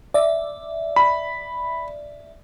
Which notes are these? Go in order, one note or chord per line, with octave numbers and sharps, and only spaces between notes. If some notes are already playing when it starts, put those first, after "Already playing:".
D5 E5
B5